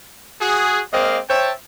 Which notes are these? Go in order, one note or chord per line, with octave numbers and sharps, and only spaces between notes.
F#4 G#4
G#3 A#3 C4 D5 D#5 F5
C5 C#5 E5 G5 A5